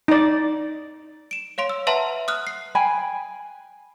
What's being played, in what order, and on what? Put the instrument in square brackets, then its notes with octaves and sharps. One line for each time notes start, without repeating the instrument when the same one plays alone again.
[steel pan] D#4 D5
[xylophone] D7 E7
C#5 F5 C6 D7
E6
B4 E5 F#5 A5 A#5 C6
D#6 F6 F#6
C7
[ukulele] G5 G#5 B5